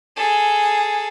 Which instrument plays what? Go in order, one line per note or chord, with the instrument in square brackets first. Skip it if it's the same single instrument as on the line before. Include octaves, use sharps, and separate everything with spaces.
[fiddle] G#4 A4